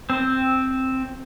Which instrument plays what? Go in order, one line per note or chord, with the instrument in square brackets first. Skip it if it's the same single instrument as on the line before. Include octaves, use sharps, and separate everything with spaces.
[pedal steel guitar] C4